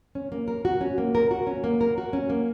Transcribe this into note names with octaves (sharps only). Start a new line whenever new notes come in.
C#4
A#3
A#4
F#4
C#4
A#3
A#4
F#4
C#4
A#3
A#4
F#4
C#4
A#3